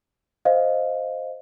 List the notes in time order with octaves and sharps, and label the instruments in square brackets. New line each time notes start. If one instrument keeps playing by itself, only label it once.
[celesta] C5 D#5 F5